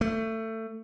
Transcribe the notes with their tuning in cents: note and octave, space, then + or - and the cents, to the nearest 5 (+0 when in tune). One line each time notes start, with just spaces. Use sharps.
A3 +20